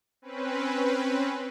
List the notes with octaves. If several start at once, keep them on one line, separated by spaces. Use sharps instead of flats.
C4 C#4 B4